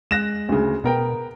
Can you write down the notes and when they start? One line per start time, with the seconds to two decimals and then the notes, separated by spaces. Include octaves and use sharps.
0.11 G#3 F#6 A#6 E7
0.49 D2 C#3
0.84 B2 B3 A#4 G5